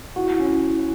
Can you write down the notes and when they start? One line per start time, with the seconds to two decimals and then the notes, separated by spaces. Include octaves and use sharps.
0.16 E4 F#4
0.39 C#4